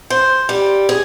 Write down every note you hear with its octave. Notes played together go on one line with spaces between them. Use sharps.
C5
G3
G#4